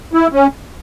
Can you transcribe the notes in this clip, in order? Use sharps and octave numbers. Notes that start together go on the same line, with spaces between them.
E4
C#4